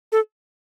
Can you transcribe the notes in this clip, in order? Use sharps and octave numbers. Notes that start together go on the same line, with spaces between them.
A4